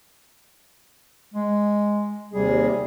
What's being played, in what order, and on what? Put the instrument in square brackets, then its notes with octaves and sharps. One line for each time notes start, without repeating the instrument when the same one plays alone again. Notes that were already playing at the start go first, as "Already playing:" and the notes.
[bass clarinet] G#3
[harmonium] D#2 C3 G#4 [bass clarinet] G3